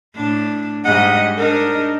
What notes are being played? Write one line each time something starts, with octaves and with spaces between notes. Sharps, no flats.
A2 D4
G#2 G3 D#5 F#5
D4 D#4 A#4